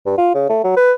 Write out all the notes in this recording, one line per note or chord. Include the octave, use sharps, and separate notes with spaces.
G2
F4
C#3
A3
F#3
B4